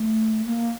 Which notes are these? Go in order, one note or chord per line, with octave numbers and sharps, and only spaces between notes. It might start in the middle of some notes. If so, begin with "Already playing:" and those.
Already playing: A3
A#3